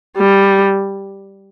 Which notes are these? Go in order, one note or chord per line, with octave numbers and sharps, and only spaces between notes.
G3